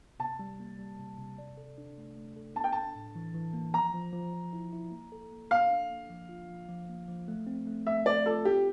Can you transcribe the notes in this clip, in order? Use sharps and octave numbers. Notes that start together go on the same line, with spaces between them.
C3 A5
G3
A#3
G3
C3
C3
D5
A4
D4
A3
A3
A4
D4 A5
G5
D4 A5
A2
E3
E3
A#3
F3 A#5
F3
F3
F3
E4
E4
A#3
A4
A#3
D4 F5
D4
A#3
F3
F4
F3
F3
A#3
F3
A3
C4
A3
A3 E5
A3 D5
F4 A4
C4 G4